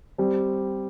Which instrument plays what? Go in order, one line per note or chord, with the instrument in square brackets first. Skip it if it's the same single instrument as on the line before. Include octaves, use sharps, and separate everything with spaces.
[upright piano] G3 C4